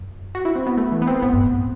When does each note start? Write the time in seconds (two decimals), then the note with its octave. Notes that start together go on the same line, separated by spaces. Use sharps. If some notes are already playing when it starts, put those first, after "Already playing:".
Already playing: F#2
0.35 F#4
0.45 E4
0.56 C4
0.66 B3
0.77 A3
0.92 E3
1.02 B3
1.07 C4
1.22 A2 B3
1.33 G2
1.43 A2